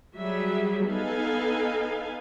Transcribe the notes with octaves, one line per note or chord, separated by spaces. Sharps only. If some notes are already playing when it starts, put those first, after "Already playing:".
F#3 G3 G#4 E5
B3 D#4 A4 F5 G#5